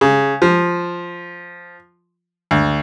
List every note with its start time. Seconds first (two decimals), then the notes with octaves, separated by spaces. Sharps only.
0.01 C#3
0.42 F3
2.51 D2